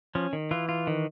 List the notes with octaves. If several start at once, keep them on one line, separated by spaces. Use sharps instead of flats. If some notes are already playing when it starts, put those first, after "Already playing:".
F3 C#4
D#3
E3 F4
F4
D#3